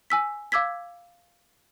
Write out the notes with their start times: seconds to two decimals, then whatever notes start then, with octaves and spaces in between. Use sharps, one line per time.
0.10 G#5 E6 B6
0.52 F5 D6 E6 G#6 B6